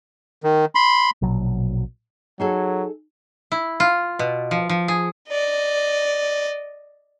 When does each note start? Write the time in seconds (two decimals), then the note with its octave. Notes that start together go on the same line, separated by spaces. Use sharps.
0.44 D#3
0.75 B5 C6
1.22 A#1 B2 F#3
2.40 F#3 D#4 G#4 A4
3.52 E4
3.80 F4
4.19 B2
4.51 F3
4.69 F3
4.88 G#4
5.29 D5 D#5